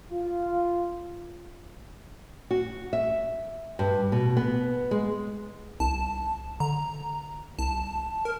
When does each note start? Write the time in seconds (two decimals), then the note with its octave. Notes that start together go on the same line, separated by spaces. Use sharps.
0.11 F4
2.51 F#4
2.93 E5
3.79 G2
4.12 B2
4.37 B3
4.91 G#3
5.80 C2 A5
6.60 D3 A#5
7.59 C2 A5
8.25 A#4